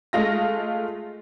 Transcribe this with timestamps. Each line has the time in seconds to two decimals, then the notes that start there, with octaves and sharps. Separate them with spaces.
0.13 G#3 A3 F4 A#6